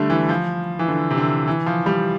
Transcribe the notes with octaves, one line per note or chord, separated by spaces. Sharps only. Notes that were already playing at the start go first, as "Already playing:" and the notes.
Already playing: D3 G3 A3
E3
F3
E3
D3
C3
D3
E3
F3
G3